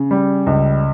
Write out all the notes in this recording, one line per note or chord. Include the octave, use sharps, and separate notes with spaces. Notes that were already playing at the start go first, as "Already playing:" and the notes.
Already playing: C#3
G3
C#2